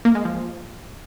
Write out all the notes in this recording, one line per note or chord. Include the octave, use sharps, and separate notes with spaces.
A#3
G#3
F3